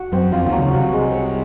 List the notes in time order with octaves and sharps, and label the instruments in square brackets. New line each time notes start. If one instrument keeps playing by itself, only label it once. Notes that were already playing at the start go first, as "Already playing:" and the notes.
Already playing: [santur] F#4
[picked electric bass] F#2 F#3 [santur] C4
[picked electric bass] F2 F3 [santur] F4
[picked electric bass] D#2 D#3
[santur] F#3
[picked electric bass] C#2 C#3
[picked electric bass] C2 C3 [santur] F#4
[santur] G#3
C#5